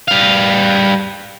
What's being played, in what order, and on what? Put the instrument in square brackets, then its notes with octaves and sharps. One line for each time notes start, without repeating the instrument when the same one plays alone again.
[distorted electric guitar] G3 F5